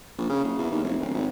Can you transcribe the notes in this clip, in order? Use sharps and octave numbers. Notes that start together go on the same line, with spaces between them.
A#1
C#3
F#1
E2
D#2
F1
D1
G#1